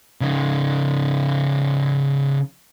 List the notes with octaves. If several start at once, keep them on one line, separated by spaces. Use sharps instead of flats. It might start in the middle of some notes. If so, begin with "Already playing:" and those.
C#3 D#4